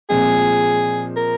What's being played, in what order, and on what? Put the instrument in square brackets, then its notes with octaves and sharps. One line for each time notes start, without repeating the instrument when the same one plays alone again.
[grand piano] A#2 F3 G#3 C4 [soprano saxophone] G#4
[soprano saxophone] A#4